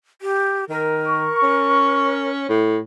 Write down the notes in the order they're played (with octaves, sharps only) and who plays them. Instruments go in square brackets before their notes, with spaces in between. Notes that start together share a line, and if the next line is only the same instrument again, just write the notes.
[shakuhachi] G4
[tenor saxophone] D#3 [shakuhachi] A#4
[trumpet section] C#6
[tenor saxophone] C#4
A2